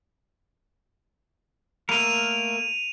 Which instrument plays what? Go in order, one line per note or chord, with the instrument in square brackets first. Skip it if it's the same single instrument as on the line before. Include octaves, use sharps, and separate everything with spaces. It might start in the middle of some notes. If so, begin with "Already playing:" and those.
[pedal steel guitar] A3 A#3 A#4 [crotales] D#7 F7